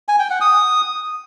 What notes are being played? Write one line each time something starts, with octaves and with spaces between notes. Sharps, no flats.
G#5
G5
F#5
D#6